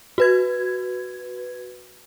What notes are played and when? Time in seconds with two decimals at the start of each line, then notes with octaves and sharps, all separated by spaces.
0.18 F#4 B4 G#6